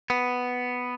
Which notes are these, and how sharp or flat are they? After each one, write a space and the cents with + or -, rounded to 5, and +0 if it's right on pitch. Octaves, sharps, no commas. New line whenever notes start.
B3 +5